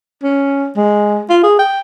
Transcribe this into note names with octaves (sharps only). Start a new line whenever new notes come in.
C#4
G#3
F4
G#4
G5